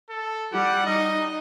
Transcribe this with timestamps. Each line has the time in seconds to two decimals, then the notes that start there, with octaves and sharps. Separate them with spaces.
0.10 A4
0.53 G3 G4 F#5
0.86 D#4 D#5